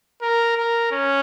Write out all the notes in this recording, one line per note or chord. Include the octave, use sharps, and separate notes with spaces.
A#4
A#4
C#4